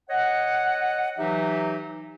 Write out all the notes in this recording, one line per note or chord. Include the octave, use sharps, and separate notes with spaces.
C#5 D#5 F#5
E3 F#3 D#4 G4 E5